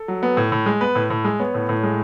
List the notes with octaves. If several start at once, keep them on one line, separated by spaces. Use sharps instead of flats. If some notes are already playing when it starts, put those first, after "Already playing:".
Already playing: A4
F#3
B3
A2
A2
G#3
B3 B4
A2
A2
G#3
B3 C#5
A2
A2
G#3